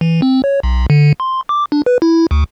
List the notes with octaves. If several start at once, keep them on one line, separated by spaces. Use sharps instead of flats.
E3
C4
C#5
B1
D3
C6
D6
D4
B4
E4
D2